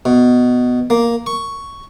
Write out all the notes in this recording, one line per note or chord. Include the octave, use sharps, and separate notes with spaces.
B2
A#3
C#6